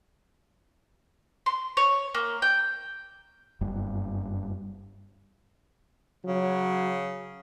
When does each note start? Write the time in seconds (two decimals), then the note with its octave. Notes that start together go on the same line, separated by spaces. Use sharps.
1.46 C6
1.77 C#5
2.15 A#3
2.42 G5
3.61 F#1 G2
6.25 C#3 F#3